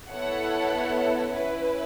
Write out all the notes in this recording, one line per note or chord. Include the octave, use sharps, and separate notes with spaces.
B3 E4 A4 C#5 F#5
C#4 E4 B4